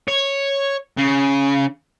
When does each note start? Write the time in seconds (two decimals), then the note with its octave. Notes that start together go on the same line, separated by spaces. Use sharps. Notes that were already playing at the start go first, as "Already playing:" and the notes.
0.08 C#5
0.98 C#3